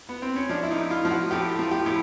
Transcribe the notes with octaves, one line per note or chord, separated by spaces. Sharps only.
B3
C4
C#4
F3 D4
E4
D#4
A2
F4
F3
F#4
A2 G4
F3
G4
A2